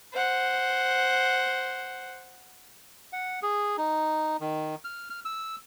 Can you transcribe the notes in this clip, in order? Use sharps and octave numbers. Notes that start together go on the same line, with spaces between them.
C5 F#5
F#5
G#4
D#4
D#3
F6
F6
E6